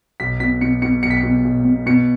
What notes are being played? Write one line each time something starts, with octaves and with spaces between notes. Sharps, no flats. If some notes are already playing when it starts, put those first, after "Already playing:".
B1 B6
B2 B6
B2 C#7
B2 C#7
B1 C#7
B6
C#7
B2
B1
B2
B2 C#7